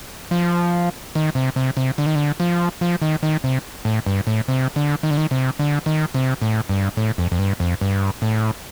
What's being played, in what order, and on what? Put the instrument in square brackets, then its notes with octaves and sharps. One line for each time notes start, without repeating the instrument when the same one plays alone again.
[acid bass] F3
D#3
C3
C3
C3
D3
D#3
D3
F3
F3
D#3
D#3
C3
A2
G2
A2
C3
D3
D#3
D3
D#3
C3
D3
D#3
C3
A2
G2
A2
F2
F2
G2
F2
G2
A2